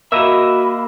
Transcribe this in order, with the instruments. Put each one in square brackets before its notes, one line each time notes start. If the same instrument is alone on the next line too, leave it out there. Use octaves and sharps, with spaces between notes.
[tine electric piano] A#3 [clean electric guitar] F#4 D#5 E5 [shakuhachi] B5 [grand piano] E6 E7